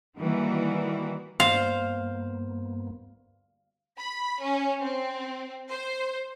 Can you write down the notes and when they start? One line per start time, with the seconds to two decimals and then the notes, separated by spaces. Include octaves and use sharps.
0.17 D#3 E3 G3 A#3 F#4
1.40 G2 A#3 B3 C5 F5
3.98 B5
4.41 C#4
4.82 C4
5.70 C5